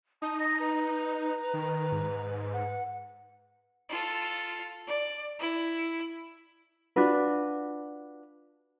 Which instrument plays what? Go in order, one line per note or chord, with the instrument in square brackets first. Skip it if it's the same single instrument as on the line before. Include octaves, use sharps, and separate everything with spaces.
[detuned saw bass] D#4 [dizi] A5 [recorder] D#6
[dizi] D#6 [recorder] A#6
[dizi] B4 [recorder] A#5
[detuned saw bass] D#3
G#2
[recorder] F#5
[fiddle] F4 A4
D5
E4
[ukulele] D4 F4 F#4 B4